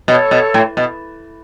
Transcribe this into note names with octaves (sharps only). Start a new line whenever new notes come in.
B2 A4 C#5
B2
A2
B2